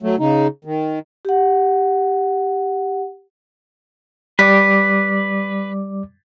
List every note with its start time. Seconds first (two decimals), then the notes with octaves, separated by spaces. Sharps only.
0.03 F#3 A3
0.19 C#3 D#4
0.65 D#3
1.25 G4 F#5
4.39 G3 B4 D5 D6